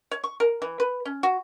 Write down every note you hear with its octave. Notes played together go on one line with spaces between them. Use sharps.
C#5
C#6
A#4
E3
B4
C#4
F#4